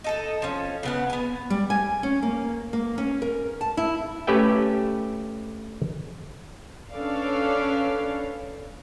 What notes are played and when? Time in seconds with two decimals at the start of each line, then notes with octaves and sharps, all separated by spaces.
0.04 D#4 A4 D#5
0.42 F3 C#4
0.83 C#3 B3 F#5
1.10 B3 G#5
1.50 G3
1.70 G#5
2.03 C#4
2.22 A#3
2.73 A#3
2.98 C#4
3.22 A#4
3.61 A5
3.77 E4
4.27 A3 C#4 G4 B4 E5 G5
6.92 C#4 D4 A4 B4 D5 F5